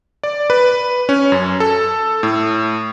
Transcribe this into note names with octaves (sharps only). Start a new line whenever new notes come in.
D5
B4
C#4
F#2
A4
A2